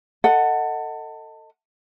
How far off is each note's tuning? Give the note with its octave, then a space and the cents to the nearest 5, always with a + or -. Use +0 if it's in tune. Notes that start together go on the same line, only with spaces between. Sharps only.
A4 +25 D#5 +10 F#5 +0